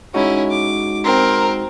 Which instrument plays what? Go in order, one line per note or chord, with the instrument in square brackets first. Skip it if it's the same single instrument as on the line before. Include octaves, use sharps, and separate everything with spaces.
[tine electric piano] G#3 D#4 F#4 [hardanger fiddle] C#4 E4
[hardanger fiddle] D6
[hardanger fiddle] C4 [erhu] A#4